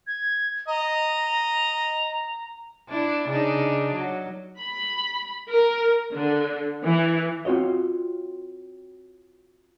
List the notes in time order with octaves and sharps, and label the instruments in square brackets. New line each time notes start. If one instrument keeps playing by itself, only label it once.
[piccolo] G#6
[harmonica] D#5 [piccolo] A#5
[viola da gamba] D4 E4
C#3 D4 D#4
F#3
[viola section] B5
A#4
D3
E3
[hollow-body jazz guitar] C4 F4 F#4 C#5 D#5